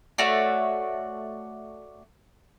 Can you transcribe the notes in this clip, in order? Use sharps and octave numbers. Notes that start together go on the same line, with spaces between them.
A3 F#4 C#5 D5